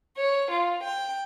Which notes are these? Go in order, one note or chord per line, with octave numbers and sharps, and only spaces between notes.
C#5
F4
G5